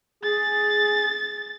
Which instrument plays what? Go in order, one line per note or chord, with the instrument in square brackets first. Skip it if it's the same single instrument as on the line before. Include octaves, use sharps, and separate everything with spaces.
[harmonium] G#4 [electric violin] A6